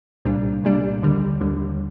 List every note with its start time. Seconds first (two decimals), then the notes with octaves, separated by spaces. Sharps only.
0.25 C2 A#2 G3 D4
0.64 C2 A#2 G3 D4
1.02 D#2 D3 G3
1.40 D#2 D3 G3